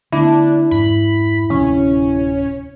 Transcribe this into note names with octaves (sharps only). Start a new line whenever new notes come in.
D3 A3 B3 D4 E4
F2 G#2 B5
D1 C3 F3 C#4